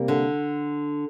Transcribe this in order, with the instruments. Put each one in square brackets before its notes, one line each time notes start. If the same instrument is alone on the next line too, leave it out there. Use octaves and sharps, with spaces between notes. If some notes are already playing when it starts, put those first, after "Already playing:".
Already playing: [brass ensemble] C3 G3 A#3
[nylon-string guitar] D3